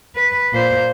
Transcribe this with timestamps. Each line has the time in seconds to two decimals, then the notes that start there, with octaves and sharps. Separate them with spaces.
0.16 B4
0.53 A#2 C5